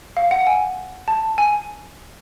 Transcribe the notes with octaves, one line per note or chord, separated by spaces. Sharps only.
F5
F#5
G#5
A5
G#5